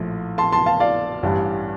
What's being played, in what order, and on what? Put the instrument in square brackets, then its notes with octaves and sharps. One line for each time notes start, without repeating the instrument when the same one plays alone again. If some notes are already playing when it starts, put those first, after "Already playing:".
Already playing: [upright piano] A#1 A2 F3
A5 C6
A5 C6
F5 A5
D5 F5
A1 G2 E3 G3